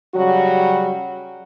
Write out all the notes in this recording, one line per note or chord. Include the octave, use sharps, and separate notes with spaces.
C#3 F#3 G3 F#4